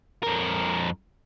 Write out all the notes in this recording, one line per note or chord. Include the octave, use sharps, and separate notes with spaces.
F2 A#4